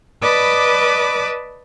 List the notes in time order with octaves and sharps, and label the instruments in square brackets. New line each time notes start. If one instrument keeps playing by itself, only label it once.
[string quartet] B4 D5 D#5 A5 B5 D6